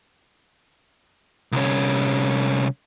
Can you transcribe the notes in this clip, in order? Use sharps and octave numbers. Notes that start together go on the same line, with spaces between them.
C2 C#4